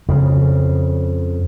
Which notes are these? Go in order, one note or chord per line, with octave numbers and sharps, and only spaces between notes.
F2 C#3